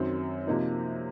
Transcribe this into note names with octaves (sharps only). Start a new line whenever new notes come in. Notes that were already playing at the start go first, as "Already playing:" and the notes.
Already playing: F#2 D#3 F#3 C4
C3 F3 A#3 D#4